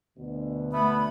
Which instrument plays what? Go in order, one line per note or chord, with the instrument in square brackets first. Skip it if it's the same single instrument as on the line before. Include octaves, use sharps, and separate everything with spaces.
[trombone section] D2 B2 D3
[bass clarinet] A3 [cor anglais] B3 [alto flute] B5